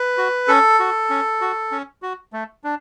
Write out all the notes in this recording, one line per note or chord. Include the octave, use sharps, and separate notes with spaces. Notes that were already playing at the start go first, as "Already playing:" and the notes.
Already playing: B4
F#4
C#4 A4
F#4
C#4
F#4
C#4
F#4
A3
D4